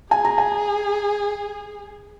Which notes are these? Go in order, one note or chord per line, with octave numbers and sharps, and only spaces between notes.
G#4 G#5
A#5
G#5